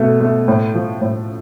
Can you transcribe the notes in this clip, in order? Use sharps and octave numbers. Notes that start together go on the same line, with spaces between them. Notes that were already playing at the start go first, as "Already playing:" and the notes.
Already playing: B2 A3
A3
A2
F3
A2